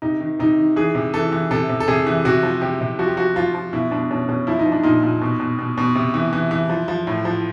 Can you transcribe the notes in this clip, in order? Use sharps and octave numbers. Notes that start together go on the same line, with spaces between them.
C3 D#4
D#3
C3 D#4
D#3
E3 G#4
C3
E3 A4
E3
C3 A4
C3
A4
C3 G#4
E3
C3 F#4
F3
C3 G4
C3
F3 F#4
G4
F3 F#4
F3 F4
F3
B2 E4
B2 D4
B2 C#4
B2 C#4
F3 E4
D#4
F3
D4
A#2 D#4
A#2
B2
B2
B2
B2
C3
E3
E3
E3
F3
F3
A2
F3